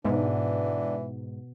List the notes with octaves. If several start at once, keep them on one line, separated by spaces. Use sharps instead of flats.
G#2 B2 D3 E3 B3 D4